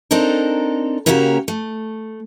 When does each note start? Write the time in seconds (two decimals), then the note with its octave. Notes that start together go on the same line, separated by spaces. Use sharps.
0.11 C4 D4 D#4 A4 A#4
1.06 C#3 A#3 C#4 F#4 G4 A#4
1.48 A3